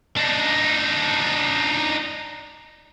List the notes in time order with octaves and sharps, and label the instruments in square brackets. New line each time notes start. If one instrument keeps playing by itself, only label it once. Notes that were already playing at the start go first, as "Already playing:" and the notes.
[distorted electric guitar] D4 D#4